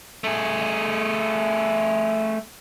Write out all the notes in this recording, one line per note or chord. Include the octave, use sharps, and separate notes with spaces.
A3 G#4